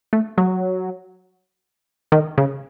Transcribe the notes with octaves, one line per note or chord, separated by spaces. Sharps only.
A3
F#3
D#3
C#3